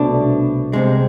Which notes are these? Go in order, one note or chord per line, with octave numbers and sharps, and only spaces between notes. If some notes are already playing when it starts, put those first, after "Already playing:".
Already playing: C2 B2 A3 D4
C2 C3 G#3